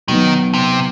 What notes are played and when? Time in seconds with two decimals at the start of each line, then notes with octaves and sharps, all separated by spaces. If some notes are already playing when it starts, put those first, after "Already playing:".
0.08 B2 D#3 F#3 B3 D#4
0.54 C3